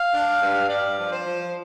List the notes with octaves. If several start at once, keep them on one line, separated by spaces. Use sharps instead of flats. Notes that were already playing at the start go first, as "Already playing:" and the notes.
Already playing: F5
D4
G2
G2 D5
F3
C5
F3